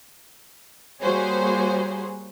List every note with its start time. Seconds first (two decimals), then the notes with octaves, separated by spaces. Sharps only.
1.02 G3 A#3 F#4 G#4 C5 C#5